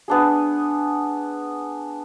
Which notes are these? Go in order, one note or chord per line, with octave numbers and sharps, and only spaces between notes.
B3 D4 G#4